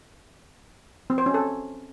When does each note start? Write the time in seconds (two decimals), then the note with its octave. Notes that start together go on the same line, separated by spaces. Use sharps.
1.10 C4
1.18 C5
1.26 C#4
1.34 A4